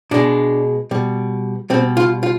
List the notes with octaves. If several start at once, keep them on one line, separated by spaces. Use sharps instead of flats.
B2 G#3 D4
B2 G3
B2 G3 C4
F4
F4